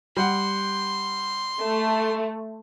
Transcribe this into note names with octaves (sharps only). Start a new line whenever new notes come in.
G3 F#5 C6
A3